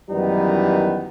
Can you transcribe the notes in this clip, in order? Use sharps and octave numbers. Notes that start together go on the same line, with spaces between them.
F#2 D#3 E3 G3 B3 D#4